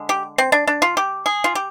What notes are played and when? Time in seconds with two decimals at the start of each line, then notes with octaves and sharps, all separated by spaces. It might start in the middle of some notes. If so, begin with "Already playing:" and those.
Already playing: D3 G#3
0.09 G4
0.38 C4
0.52 D4
0.67 D4
0.82 F4
0.97 G4
1.26 G#4
1.44 F4
1.55 G4